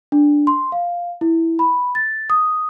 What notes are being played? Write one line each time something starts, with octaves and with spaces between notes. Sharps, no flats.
D4
C6
F5
E4
B5
A6
D#6